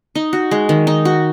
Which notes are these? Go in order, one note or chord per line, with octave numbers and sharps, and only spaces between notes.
D#4
F#4
G#3
D#3
D#4
F#4